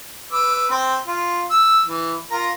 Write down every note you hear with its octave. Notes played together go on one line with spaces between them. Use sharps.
B4 D6 E6
C4
F4
E6
E3
F4 A#4 A#5